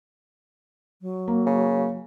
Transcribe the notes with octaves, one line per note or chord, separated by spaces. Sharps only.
F#3
A#3
C#3